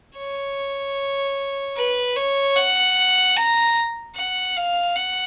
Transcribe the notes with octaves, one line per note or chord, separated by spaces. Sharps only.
C#5
B4
C#5
F#5
A#5
F#5
F5
F#5